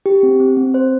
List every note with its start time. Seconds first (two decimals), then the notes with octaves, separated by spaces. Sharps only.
0.06 G4
0.23 C4
0.40 C4
0.57 C4
0.74 C5